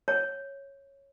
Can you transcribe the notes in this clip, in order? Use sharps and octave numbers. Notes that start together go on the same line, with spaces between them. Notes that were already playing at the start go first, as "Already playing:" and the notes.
C#5